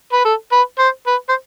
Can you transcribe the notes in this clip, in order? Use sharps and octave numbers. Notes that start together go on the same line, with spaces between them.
B4
A4
B4
C5
B4
C5